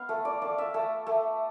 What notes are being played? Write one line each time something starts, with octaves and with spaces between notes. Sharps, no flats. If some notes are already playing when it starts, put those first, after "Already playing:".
Already playing: B3 F5
A3
D5
A3 D5
E5
A3
A3